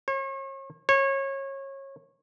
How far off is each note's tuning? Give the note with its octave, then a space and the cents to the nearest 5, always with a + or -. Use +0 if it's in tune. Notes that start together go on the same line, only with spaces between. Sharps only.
C#5 -40
C#5 -25